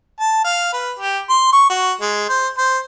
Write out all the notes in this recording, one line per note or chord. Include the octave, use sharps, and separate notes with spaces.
A5
F5
B4
G4
C6
C#6
F#4
G#3
C5
C5